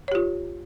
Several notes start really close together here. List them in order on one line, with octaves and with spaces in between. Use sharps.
C#5 G4 F4